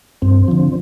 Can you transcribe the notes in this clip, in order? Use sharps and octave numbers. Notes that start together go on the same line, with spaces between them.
G2 C4
D3 F3